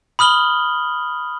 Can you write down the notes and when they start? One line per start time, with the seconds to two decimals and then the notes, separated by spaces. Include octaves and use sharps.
0.19 B5 D#6 F6 F#7 G7